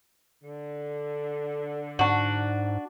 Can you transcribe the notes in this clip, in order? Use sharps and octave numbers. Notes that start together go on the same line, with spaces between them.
D3
G#2 D4 F#4